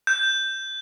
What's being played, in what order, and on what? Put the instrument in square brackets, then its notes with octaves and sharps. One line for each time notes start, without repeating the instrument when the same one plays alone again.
[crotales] G6